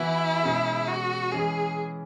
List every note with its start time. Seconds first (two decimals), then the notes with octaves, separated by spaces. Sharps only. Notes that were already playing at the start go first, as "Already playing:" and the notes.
Already playing: E3 B3 E4 F#4 B4
0.43 B2 G#3 C#4 G#4
0.88 F#4
1.32 E3 G#3 C#4 G#4